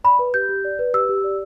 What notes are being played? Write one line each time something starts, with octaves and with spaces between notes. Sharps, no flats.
D5 B5
B4
G4 G6
G4
D5
B4
G4 E6
G4
D5